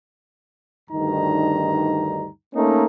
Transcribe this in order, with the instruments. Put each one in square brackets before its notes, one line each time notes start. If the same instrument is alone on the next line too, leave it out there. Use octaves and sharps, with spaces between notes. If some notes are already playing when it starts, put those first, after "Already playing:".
[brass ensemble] D2 G2 D#3 D#4 A#5
A3 A#3 C#4 D#4